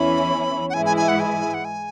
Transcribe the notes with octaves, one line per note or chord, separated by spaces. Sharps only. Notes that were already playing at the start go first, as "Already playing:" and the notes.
Already playing: E2 E3 C#4 E4 B5
F#5
G#2 E3 G#3 E4 G#5
G#5
G#5
F#5
G#5
F#5
G#5